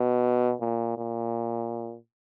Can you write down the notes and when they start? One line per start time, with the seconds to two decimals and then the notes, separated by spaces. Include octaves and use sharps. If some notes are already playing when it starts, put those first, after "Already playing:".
Already playing: B2
0.60 A#2
0.97 A#2